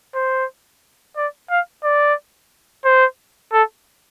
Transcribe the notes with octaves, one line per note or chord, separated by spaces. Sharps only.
C5
D5
F5
D5
C5
A4